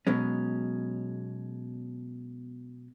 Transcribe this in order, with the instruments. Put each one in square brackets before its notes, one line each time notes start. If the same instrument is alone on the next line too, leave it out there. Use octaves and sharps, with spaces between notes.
[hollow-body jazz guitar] B2 F#3 G#3 C#4